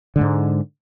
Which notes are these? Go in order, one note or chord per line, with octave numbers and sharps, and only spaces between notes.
G#2 D3 G#3